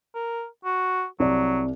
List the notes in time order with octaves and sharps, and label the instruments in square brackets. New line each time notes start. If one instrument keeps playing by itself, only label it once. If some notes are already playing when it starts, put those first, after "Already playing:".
[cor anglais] A#4
F#4
[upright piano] C2 D5 [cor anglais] F#3